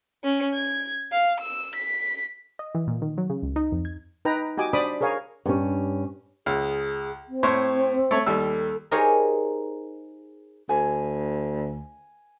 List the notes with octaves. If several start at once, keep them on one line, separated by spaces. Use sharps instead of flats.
C#4
G#6
F5
E6
B6
D#5
E3
A#2
D#3
F#3
C#3
C#2
D#4
F2
G#6
D#4 B4 G5 A#5
F#4 G4 D#5 G#5 D6
D4 C5 D5 B5 D6 D#6
G#4 A#4 C#5 F5 G#5
G2 C#4
C#2 G#4
C4
A2 C5 C#5
A3 C#5
D#2 G3 A4 E6
D#4 G4 G#4 A#4 C5 C#5
D2 G#5